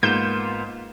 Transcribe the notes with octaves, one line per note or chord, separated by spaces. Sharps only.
G#2 A#3 B3 F4 G6 E7